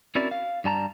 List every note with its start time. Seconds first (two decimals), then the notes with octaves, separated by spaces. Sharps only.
0.15 C4 C#4 E4 F#4 A#4 D5
0.31 F5
0.64 G2 G3 A5 A#5